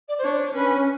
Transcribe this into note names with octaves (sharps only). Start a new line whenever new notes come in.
D5
C5
D4 C#5
C#5
C#4 B4